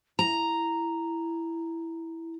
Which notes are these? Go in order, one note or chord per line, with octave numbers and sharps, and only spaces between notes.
E4 A#5